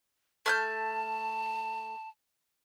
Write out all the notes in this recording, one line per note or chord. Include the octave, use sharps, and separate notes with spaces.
A3 A5 F6 G6